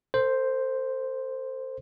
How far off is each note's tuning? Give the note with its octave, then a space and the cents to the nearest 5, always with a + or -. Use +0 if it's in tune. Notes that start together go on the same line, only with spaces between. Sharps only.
A4 +45 C5 +0